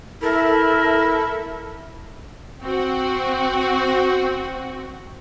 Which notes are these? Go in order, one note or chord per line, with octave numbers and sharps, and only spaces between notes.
E4 A4 A#4 E5
C4 F#4